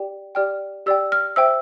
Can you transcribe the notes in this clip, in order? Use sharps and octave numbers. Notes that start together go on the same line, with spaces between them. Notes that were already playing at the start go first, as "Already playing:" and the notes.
Already playing: G4 D5 G5
G4 D5 G5 F6
G4 D5 G5 E6
F6
C5 E5 G5 E6